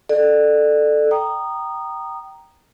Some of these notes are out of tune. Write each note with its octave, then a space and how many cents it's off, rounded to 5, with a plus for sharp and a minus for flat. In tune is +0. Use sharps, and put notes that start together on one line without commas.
A4 +0 D5 +30
G5 -15 A#5 +0 D#6 -15